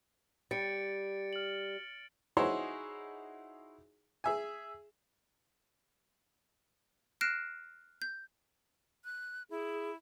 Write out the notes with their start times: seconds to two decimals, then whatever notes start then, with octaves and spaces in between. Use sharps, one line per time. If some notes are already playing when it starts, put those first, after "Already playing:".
0.51 G3 A6 C#7 D7
1.33 F6 F#7
2.37 D#4 E4 F#4 G#4 C5 C#5
4.24 G#4 E5 G#5
7.21 F6 F#6 A#6 C7 D7 E7
8.02 G6
9.05 F#6
9.50 E4 G#4